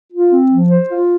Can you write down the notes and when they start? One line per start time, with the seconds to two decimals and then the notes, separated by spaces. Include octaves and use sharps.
0.12 F4
0.31 C4
0.50 F3
0.69 C5
0.88 F4